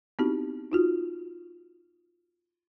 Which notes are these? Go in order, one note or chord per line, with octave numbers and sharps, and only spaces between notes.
B3 C4 D#4 E4 F#4 G4
D#4 F4 F#4